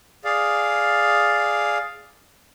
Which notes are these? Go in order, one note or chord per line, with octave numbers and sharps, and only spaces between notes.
G#4 D5 F5